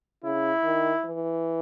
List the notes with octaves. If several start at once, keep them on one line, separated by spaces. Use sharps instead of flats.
C#3 E4
D#3
E3